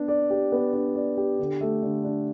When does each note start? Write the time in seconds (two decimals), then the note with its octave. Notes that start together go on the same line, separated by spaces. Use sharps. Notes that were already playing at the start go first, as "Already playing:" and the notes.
Already playing: B3 D4
0.08 D5
0.30 G4
0.52 B3
0.73 D4
0.95 D5
1.17 G4
1.39 D3
1.61 A3
1.83 D3
2.04 D4